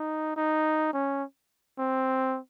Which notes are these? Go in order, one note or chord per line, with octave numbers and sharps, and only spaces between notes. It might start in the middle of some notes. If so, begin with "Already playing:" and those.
Already playing: D#4
D#4
C#4
C4